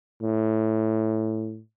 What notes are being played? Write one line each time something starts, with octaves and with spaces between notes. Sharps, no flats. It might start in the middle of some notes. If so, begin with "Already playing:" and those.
A2